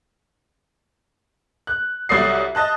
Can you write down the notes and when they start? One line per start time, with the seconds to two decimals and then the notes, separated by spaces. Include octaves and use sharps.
1.67 F#6
2.09 C2 F#3 A4 D5 D#6 C7
2.55 D#5 A5 F#6